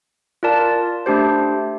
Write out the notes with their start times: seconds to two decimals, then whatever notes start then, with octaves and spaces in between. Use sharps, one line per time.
0.43 F4 A#4 D5 A5
1.06 A3 D4 G4 C5